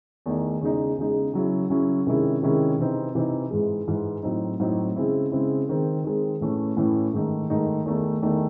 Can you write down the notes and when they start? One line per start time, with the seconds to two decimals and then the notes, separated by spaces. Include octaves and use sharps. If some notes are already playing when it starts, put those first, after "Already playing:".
0.26 E2 D#3 A3 D#4
0.61 E2 C#3 G#3 D#4
0.97 E2 C#3 G#3 D#4
1.34 C#3 F#3 C#4 E4
1.70 C#3 F#3 C#4 E4
2.07 C3 D#3 G#3 C#4 E4
2.43 C3 D#3 G#3 C#4 E4
2.78 C3 E3 C4 D#4
3.15 C3 E3 C4 D#4
3.51 G#2 E3 G#3
3.88 G#2 E3 G#3
4.23 A2 F#3 C4 D#4
4.60 A2 F#3 C4 D#4
4.96 C#3 G#3 C4 E4
5.32 C#3 G#3 C4 E4
5.69 D#3 G#3 C4
6.04 D#3 G#3 C4
6.41 A2 E3 A3 C#4 E4
6.77 A2 E3 A3 C#4 E4
7.14 G#2 D#3 A3 D#4
7.50 G#2 D#3 A3 D#4
7.85 E2 D#3 A3 D#4
8.22 E2 D#3 A3 D#4